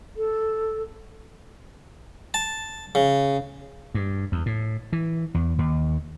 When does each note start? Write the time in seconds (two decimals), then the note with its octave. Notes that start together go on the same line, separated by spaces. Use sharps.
0.16 A4
2.34 A5
2.95 C#3
3.95 G2
4.32 E2
4.46 A2
4.93 E3
5.34 E2
5.59 D#2